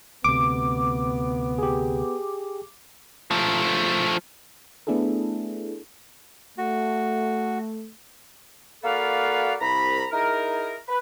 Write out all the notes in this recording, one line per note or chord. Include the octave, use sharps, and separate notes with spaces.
D2 C3 B3 D6
G4 G#4
F3 A3
A3 B3 D4 E4 G#4 A4
A3 F#4
A#3 F#4 A4 B4 D5 F5
C2 A#5 B5
D#4 E4 G#4 A#4
B4